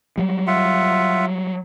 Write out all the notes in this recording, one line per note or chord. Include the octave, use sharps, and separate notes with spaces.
F#3 G3
F4 E5 F#5